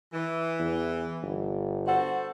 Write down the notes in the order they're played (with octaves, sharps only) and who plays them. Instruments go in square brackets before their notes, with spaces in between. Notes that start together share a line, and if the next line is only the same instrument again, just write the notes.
[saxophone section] E3
[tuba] E2
G1
[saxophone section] F#4 A4 C5 [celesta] F#5